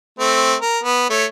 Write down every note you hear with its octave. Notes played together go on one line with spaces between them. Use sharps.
A3 C4
A#4
B3
A3 C#5